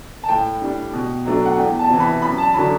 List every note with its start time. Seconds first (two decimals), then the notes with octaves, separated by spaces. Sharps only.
0.23 A5
0.29 A2 G5
0.62 G3 D4
0.93 B2
1.25 F#3 A3 D4
1.45 F#5
1.57 E2 G5
1.79 A5
1.90 C3 E3
2.00 B5
2.22 F#2 B5
2.38 A5
2.54 F#3 B5
2.57 D3